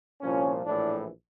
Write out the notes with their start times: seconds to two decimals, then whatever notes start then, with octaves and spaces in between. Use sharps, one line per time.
0.20 C2 A#2 F3 C#4
0.65 A#1 A2 E3 D4